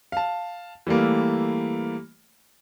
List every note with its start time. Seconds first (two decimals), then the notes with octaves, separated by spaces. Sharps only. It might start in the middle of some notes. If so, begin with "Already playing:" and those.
0.12 F5 A5
0.87 E3 G3 A3 A#3